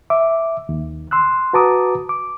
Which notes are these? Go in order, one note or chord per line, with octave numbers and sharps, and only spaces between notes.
E5 D6
D#2
C6 E6 F#6
F#4 B4 A5 A#5 D6 D#6
D6